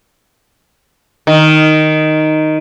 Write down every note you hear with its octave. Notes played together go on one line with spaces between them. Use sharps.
D#3